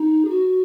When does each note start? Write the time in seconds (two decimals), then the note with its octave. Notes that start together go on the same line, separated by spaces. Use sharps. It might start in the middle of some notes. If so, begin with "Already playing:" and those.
Already playing: D#4
0.24 G#4
0.29 F#4